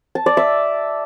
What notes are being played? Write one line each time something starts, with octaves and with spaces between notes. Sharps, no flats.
A5
D5
E5